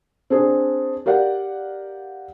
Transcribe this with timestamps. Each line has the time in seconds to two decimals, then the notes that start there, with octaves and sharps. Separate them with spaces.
0.30 C4 D4 G#4
1.06 G4 A#4 D5 F5 F#5